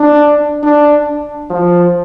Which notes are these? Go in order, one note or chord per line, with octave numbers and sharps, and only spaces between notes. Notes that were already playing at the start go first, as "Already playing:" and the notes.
Already playing: D4
D4
F3